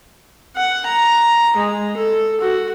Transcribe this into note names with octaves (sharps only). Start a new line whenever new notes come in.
F#5
A#5
G#3
A4
F#4